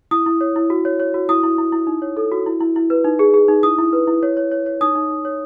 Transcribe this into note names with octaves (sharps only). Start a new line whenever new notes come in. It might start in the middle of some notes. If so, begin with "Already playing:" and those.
E4 D#6
E4
C#5
E4
F#4
C#5
C#5
F#4
E4 D#6
E4
E4
E4
D#4
C#5
A4
F#4
E4
E4
E4
B4
D#4
G#4
G#4
D#4
E4 D#6
E4
B4
E4
C#5
C#5
C#5
C#5
D#4 D#6
D#4
D#4
C#5